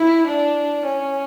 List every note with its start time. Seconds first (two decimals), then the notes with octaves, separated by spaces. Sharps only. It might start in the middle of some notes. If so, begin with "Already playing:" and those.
Already playing: E4
0.28 D4
0.86 C#4